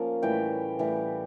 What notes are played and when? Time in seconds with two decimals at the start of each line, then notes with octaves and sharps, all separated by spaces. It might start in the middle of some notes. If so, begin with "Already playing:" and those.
Already playing: F3 A#3 C#4
0.22 A2 E3 G3 G5
0.79 A2 E3 G3